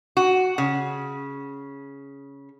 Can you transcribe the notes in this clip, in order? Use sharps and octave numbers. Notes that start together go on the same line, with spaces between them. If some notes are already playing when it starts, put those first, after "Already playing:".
F#4
C#3